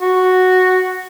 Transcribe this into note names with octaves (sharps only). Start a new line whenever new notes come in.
F#4